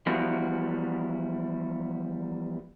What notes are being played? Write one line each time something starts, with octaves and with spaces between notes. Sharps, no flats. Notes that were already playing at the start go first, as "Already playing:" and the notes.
E3 F3 G3 B3 E4 F#4